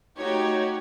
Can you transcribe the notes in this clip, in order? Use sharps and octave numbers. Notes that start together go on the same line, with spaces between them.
A3 D#4 F#4 G4 C#5